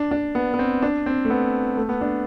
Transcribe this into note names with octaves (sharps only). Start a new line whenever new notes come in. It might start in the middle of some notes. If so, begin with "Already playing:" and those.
Already playing: D4
D4
B3
B3
C4
D4
C4
A3
B3
A3
B3
D4